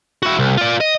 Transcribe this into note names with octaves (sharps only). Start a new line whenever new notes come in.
E4 F#4
C2
F4 D5
D#5